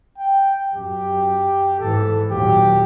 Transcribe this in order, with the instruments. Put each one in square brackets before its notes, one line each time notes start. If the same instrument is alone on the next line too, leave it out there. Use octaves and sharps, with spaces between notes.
[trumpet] G5
[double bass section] F#2 [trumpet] G4
[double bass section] G#2 E3 [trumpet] A4
[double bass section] D#2 A#2 F#3 [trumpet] G4